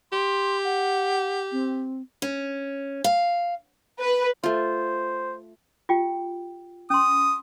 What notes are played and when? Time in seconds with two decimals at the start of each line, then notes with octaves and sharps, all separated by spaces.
0.12 G4 C6
0.64 F#5
1.52 C4
2.22 C#4
3.04 F5
4.00 B4
4.43 A3 F4 C5
5.89 F4 G4 G5
6.90 C#4 C6 D#6